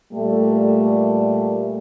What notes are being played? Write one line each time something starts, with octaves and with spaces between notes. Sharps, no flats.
A#2 G3 A3